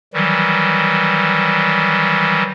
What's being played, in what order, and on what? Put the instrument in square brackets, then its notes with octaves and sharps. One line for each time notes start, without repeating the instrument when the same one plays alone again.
[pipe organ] D#3 E3 F#3 G3